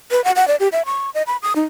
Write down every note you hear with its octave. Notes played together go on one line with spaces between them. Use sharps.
B4
F#5
F#5
D5
G4
E5
C#6
D#5
B5
D#6
D#4